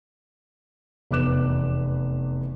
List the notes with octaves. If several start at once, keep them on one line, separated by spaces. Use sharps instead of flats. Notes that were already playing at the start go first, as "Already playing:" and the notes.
F1 E2 B4 D6 F#6 E7